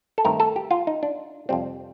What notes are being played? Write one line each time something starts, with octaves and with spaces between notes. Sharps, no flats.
A4
G2 D#3 A3 C4 A#4
A4
G4
F4
D#4
D4
F2 C3 G3 C4